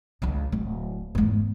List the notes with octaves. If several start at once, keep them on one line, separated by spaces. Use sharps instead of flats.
C#2 D4
D1
E2 G#2